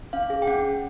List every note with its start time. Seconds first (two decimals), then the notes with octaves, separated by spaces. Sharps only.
0.13 C#4 F5
0.30 G#4
0.42 G5
0.47 C#4 F#5
0.64 C#4